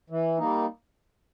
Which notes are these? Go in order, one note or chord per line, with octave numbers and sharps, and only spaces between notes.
E3
G3 A#3 D#4